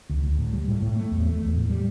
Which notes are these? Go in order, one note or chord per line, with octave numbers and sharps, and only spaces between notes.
D2
D2
A2
G3
A2
A2
A3
E2
A3
E2
A2
G3